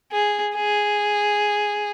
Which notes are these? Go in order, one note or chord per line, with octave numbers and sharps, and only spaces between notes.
G#4
G#4